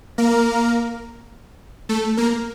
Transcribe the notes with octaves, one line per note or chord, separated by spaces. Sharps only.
A#3 A#4
A3 A4
A#3 A#4